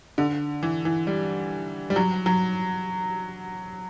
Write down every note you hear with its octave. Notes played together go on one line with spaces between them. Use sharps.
D3
E3
E3
G3
G3
F#3
F#3